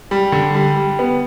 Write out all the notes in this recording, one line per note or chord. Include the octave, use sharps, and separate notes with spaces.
G3
D3
G3
G3
B3